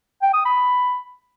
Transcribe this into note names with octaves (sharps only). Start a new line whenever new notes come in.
G5
D#6
B5